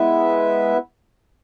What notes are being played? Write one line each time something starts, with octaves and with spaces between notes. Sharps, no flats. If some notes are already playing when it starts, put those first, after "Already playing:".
Already playing: G#3 B3 E4 B4 E5